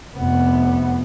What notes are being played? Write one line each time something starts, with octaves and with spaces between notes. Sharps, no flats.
F1 B3